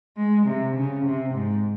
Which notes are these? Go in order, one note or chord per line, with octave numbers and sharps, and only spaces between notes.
G#3
C3
C#3
C3
G#2